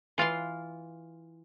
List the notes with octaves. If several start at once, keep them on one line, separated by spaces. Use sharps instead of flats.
E3 F4 F5 C6